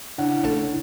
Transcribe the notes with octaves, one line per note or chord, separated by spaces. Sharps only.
C#3 D4 E4 F#5
A#1 A3 A4